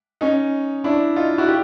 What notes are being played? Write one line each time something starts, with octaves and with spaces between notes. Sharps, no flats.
C#4 D#4
D4 E4
D#4 F4
E4 F#4
G4